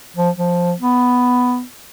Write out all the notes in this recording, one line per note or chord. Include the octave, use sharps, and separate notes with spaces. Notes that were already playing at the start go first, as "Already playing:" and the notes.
F3
F3
B3